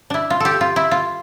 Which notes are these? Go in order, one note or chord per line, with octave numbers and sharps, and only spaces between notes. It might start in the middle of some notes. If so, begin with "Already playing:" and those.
D4 E4
F4
G4 A4
F4
E4
F4